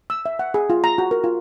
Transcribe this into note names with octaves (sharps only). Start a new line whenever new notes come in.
E6
E5
F#5
G#4
F4
A#5
F#4
A#4
F4